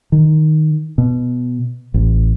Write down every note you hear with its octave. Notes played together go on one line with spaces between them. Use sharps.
D#3
B2
A1